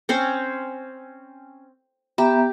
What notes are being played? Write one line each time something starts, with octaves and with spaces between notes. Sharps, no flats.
C4 C#4 C5
B3 G4 E5 A#5